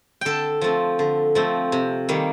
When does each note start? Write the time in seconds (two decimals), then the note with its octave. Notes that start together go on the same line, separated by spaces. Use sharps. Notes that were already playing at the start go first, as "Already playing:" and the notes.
0.21 D3 A4 G5 A5
0.61 F3 A3 C4
0.99 D3
1.35 F3 A3 C4
1.72 C3
2.09 D#3 G3 A#3